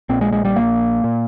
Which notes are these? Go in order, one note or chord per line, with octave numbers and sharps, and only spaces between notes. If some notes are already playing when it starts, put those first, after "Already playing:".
A#1 A#2 C4
G#3
G#3
G3
A#1 A#2 A#3
A#2